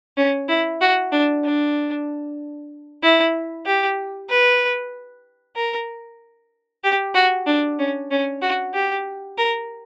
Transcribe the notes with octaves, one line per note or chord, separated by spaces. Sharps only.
C#4
E4
F#4
D4
D4
E4
G4
B4
A#4
G4
F#4
D4
C#4
C#4
F#4
G4
A#4